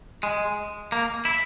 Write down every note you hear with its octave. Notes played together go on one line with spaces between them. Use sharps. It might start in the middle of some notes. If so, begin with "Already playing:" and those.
G#3
A#3
E4